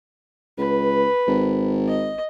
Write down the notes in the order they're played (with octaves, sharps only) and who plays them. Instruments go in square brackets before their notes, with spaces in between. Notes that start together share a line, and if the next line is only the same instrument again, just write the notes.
[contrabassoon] C#2 [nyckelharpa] B4
[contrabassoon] G#1
[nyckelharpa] D#5